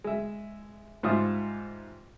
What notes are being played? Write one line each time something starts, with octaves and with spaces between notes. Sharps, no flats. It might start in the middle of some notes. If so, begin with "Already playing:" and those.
G#3 E5
G#2 G3 F4 E5 D#6